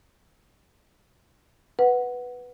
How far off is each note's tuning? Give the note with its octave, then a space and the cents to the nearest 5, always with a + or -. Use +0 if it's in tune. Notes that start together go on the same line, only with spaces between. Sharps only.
B4 +0 F#5 +0